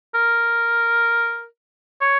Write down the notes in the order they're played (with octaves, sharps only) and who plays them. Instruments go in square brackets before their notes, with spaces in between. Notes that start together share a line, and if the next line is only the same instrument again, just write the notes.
[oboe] A#4
C#5